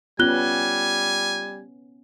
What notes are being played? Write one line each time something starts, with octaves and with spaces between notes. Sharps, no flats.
G3 B3 C#4 F4 G#5 F#6 G7